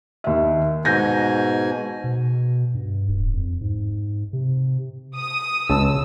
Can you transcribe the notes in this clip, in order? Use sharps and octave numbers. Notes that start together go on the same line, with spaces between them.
D#2 E5
G#2 B2 G#5 G6 A#6
B2
G2
D1
F2
G#2
C3
D#6
C#2 C#3 A5 E6